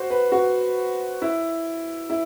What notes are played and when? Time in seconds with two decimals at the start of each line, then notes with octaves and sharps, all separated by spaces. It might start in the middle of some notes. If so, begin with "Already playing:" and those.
Already playing: F#4 C5
0.10 B4
0.32 F#4
1.22 E4
2.10 E4